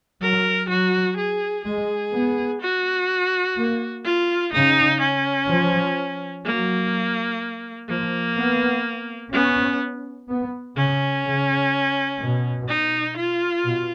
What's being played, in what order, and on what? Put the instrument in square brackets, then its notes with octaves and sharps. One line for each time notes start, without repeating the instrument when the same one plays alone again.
[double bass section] F#3 [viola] A#4
[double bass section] F#3 [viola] F#4
[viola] G#4
[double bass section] G#3 [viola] G#4
[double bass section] B3
[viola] F#4
[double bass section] A#3
[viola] F4
[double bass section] C#3 [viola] D#4
[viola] C#4
[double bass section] F3
[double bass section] F#3 [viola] A#3
[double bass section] F3 [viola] A#3
[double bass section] B3
[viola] B3 [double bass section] C#4
[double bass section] B3
[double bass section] C#3 [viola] C#4
[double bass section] C#3
B2
[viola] D#4
F4
[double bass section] B2